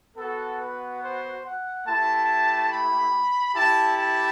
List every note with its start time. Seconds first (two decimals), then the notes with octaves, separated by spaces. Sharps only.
0.17 B3 F#4 A4
0.59 B4
1.02 C5
1.44 F#5
1.87 A3 E4 G4 A5
2.71 B5
3.55 A3 E4 G4 A5
3.98 A5